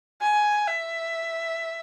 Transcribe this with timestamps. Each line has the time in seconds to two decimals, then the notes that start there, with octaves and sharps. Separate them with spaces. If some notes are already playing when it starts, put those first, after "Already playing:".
0.22 G#5
0.68 E5